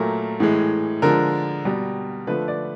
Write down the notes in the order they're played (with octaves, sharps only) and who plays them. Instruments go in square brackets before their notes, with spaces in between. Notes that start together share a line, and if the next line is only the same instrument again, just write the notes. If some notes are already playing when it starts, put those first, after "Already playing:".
Already playing: [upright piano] A#2 F#3 A3 A#4
A2 E3 G#3
D3 F3 G#3 A#4
B2 G3
D3 F3 A3 B4
D5